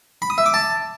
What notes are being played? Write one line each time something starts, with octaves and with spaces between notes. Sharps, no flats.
B5
D#6
E5
D6
A5